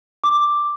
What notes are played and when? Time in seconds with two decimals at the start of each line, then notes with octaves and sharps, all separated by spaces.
0.24 D6